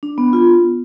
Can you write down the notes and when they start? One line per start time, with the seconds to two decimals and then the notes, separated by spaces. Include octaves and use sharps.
0.03 D4
0.18 B3
0.33 F4